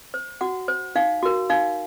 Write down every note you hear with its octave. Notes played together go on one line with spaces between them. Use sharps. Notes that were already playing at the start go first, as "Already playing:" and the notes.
C5
F#4 F#5
C5
D#4 F5
F#4 A#4
D#4 F5